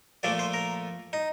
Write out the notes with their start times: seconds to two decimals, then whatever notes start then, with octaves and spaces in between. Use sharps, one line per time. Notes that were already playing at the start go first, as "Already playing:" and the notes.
0.23 A#2 F3 A3 D5
0.39 C5
0.54 A#4
1.13 D#4